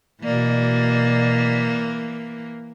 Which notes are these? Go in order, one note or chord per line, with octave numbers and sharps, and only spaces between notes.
B2 E3 A#3 D5